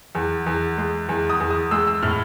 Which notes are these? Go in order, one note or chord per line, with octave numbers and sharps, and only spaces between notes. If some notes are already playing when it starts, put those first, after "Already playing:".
E2
E2
G#3
E2
D#6
E2
D#6
G#3 E6
E6
A2 F6